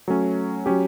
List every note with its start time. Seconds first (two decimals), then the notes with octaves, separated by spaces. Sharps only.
0.08 F#3 A3 C#4
0.66 F#3 C#4 G4